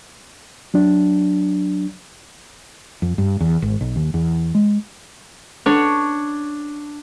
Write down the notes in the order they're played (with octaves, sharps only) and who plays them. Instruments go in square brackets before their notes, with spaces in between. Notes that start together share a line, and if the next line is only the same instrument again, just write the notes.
[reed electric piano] F#3 D4
[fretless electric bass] F2
G2
E2
G#1
B1
D#2
E2
G#3
[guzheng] D4 C#5